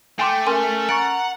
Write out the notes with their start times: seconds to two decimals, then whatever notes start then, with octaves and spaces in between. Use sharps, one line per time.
0.19 A3 G5 G#5 C6 D6
0.46 C#4 A#4 G#5 C6
0.89 F#5 A#5 C#6 A6 D7